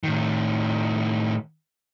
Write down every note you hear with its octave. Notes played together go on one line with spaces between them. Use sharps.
A2 D#3